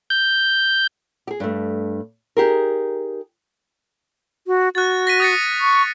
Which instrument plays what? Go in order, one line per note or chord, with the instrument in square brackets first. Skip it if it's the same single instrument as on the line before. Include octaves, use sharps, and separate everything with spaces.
[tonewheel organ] G6
[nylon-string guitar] G4 G#4
G2 A3
D#4 G4 G#4 A#4
[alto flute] F#4
[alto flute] F#4 [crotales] F#6 A6
[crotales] A#6 B6 D#7
D#6 A6 C#7
[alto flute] C#6